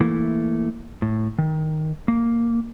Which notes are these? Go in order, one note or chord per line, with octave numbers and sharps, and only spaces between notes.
E3 A3 A#3 E4
A2
D#3
A#3